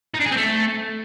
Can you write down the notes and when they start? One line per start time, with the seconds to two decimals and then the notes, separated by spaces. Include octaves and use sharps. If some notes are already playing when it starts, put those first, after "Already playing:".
0.14 D#4
0.20 D4
0.25 G#4
0.31 C4
0.37 A3